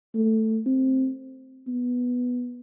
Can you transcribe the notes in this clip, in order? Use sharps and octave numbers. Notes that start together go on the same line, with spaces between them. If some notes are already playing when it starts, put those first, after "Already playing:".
A3
C4
B3